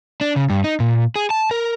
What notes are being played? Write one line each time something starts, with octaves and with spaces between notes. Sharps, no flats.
D4
C#3
G2
D#4
A#2
G#4
A5
A#4